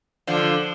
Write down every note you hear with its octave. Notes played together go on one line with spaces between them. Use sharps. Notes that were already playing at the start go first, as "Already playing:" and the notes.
D3 F3